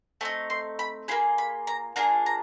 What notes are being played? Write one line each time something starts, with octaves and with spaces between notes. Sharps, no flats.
A3 C4 D#4 A5
C6
B5
A#3 D4 F4 G#4 B5
B5
A#5
A#3 D4 F4 G#4 A#5
A#5